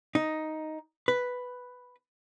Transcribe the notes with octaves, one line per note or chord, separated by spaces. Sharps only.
D#4
B4